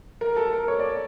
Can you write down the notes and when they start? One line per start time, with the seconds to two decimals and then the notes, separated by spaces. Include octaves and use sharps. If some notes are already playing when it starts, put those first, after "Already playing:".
0.21 A#4
0.36 A4
0.53 A#4
0.68 C#5
0.79 D5